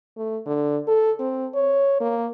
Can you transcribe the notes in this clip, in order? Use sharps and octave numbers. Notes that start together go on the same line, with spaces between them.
A3
D3
A4
C4
C#5
A#3